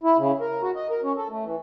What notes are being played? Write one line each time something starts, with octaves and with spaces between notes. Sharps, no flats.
E4
C#3
A#4
F#4
D#5
A#4
C#4
A4
A3
E3